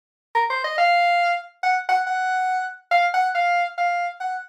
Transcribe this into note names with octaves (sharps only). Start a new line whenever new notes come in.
A#4
C5
D#5
F5
F#5
F#5
F#5
F5
F#5
F5
F5
F#5